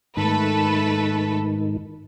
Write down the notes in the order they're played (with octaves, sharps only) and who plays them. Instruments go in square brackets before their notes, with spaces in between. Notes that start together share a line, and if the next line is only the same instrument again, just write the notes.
[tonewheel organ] G#2 D#3 [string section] A3 A4 B4